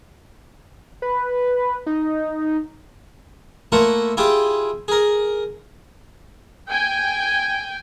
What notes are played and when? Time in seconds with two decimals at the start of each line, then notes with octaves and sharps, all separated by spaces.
1.02 B4
1.86 D#4
3.72 A3 A#3 E4 F4 F#5
4.17 E4 F4 G4 G#4 D6
4.88 G#4 A#4
6.68 G5 G#5